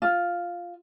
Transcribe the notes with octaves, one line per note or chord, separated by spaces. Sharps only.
F4